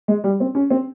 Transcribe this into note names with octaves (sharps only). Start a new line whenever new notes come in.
G#3
G3
C4
C#4
C4